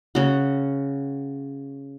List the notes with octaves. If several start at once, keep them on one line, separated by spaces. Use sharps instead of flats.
C#3 F#4